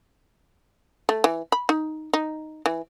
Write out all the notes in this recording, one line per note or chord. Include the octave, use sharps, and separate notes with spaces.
A3
E3
B5
D#4
D#4
E3